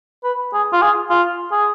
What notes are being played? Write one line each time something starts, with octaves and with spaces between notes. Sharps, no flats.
B4
G#4
F4
G#4
F4
G#4